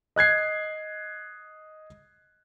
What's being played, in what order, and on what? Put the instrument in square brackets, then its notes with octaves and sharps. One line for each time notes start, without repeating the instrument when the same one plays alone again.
[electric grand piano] D#5 F#6 G#6 C7